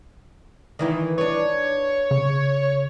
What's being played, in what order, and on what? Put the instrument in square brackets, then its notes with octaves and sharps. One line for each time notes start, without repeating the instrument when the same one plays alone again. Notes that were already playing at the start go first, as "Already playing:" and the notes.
[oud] D#3 E3 E4
[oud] D4 B4 [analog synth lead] C#5
[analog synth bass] C#3